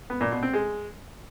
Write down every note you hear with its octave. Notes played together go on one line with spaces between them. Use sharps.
B3
A#2
B2
C4
G#3